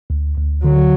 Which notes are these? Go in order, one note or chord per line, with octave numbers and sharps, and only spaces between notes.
D2
D2
D3 F#3